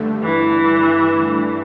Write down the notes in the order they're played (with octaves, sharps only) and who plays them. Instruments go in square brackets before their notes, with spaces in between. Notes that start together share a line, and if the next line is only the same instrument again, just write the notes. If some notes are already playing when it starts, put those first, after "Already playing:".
Already playing: [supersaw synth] G2 D3 A3
[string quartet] E3